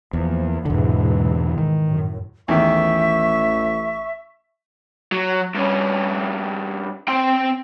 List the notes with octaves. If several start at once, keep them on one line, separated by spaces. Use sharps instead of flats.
E2 F3 A#3
E2 G#2 B2 D3 E3
D#3
F#2 A2
A1 E2 D#3 E5 C#6
F#3
G2 C#4
C4 G5